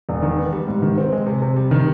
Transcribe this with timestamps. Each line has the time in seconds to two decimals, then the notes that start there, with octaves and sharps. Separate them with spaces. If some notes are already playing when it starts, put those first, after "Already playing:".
0.09 E1
0.22 D#3
0.38 B3
0.53 G3
0.67 G#2
0.82 D#3
0.98 C4
1.12 G#3
1.27 C3
1.42 C3
1.56 G3
1.71 D#3